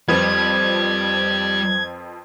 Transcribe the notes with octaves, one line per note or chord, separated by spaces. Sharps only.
F2 F3 G3 B4 G#6